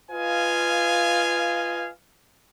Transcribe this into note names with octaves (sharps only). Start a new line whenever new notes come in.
F4 B4 D#5 F5 G#5